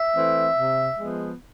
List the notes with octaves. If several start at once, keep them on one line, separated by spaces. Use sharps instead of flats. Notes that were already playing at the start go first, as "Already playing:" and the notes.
Already playing: E5
E3 A3 C4
C3
F3 G#3 B3